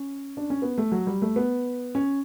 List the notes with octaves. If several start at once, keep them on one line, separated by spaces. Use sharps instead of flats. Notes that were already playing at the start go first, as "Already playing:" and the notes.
Already playing: C#4
D4
C#4
B3
A3
F#3
G3
A3
B3
C#4